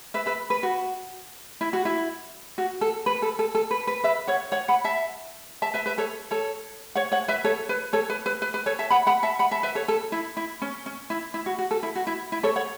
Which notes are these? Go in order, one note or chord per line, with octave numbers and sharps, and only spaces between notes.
B4 E5
B4 E5
B4
F#4
E4
F#4
E4
F#4
A4
B4
A4
A4
A4
B4
B4
B4 E5
C#5 F#5
C#5 F#5
F#5 B5
E5 A5
E5 A5
B4 E5
B4 E5
A4 C#5
A4 C#5
C#5 F#5
C#5 F#5
B4 E5
A4 C#5
B4
A4 C#5
B4
B4
B4
B4
A4 C#5
E5 A5
F#5 B5
F#5 B5
E5 A5
F#5 B5
E5 A5
B4 E5
A4 C#5
A4
E4
E4
C#4
C#4
E4
E4
F#4
F#4
A4
E4
F#4
E4
E4
A4 C#5
C#5 F#5